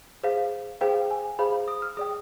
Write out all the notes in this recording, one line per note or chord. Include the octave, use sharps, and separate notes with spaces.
G#4 C5 F5
G#4 C5 F5 G5
G#5
G#4 C5 F5 B5
D#6
F6
G#4 D5 G5 D#6